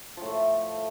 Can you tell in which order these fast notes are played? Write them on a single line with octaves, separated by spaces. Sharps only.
F3 A2 A3